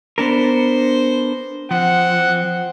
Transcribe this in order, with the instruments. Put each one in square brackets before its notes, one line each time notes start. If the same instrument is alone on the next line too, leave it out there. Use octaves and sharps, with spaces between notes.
[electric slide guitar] B3 D4 A#4 [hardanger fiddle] C5
[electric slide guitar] F3 [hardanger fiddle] C4 [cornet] F#5